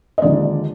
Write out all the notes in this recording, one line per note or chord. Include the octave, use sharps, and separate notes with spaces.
D#5
D#2 D3 F3 G#3 D5